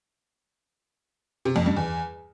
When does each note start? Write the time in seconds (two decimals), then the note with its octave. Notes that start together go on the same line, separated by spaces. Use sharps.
1.45 C3
1.56 F2
1.66 G2
1.76 E2